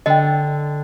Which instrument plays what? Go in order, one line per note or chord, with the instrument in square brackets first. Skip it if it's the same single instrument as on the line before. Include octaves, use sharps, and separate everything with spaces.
[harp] D3 [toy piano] D#5 G5